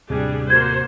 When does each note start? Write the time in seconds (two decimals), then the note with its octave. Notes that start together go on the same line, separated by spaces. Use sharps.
0.10 D#2 A2 C3 G3 D4 G#4
0.50 A#3 F#4 C5 G#6